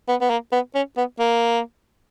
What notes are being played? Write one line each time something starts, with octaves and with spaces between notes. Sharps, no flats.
B3
B3
A#3
B3
C#4
B3
A#3